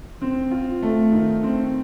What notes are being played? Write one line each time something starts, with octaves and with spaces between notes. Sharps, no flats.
C4
F4
A3
D#3
C4